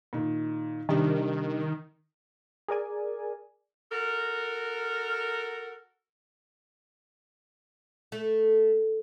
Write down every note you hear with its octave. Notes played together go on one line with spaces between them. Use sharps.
A#2 D#3
C3 D#3 G3 D4
G#4 A#4 D5 G#5
F#4 A4 A#4
A3